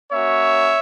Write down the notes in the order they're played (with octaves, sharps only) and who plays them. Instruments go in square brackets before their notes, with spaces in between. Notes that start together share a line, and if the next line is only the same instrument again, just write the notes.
[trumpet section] A#3 C#4 F#4 C#5 E5